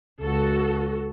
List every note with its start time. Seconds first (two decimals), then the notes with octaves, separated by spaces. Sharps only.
0.22 C#2 F#4 A4